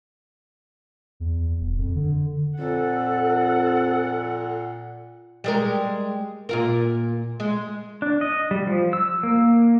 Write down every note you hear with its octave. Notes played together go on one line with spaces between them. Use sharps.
E2
D#1
F2
D3
F2 A#2 A4 F#5
G3 G#3 A#4
A#2 F4 A#4
G#3
D4
D#5
G3
F3
E6
A#3